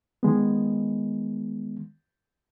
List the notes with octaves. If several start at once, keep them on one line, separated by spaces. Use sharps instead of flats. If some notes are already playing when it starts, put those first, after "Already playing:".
D#3 G#3 B3